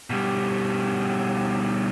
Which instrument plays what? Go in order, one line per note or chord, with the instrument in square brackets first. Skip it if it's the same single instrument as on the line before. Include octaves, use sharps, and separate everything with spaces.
[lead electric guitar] B2 G3